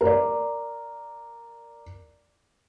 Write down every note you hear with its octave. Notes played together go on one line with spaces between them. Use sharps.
A#4 D5